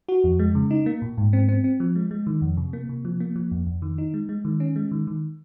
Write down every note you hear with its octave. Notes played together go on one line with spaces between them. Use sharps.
F#4
F2
G#3
C#3
D#4
A#3
A#2
G#2
C4
C4
C4
F3
G#3
G#3
D#3
F2
C3
A#3
C3
F3
A#3
F3
F2
F2
D#3
D#4
G#3
G#3
D#3
C#4
G#3
D#3
D#3